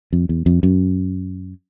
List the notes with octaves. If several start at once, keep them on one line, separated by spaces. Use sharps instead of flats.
F2
E2
F2
F#2